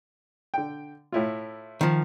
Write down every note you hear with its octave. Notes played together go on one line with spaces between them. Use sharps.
D3 G5
A2 E4 F4
D#3 F3